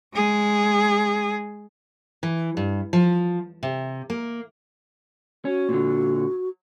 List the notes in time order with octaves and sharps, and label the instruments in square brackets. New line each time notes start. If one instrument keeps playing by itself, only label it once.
[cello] G#3 G#4
[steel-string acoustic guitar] E3
G2
F3
C3
A#3
[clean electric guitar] C#4 [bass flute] F#4
[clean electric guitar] A#2 D3